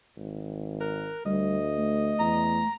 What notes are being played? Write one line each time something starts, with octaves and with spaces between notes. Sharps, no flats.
G#1
A#4 F#6
D2 G3 D#5
A3
E2 A#5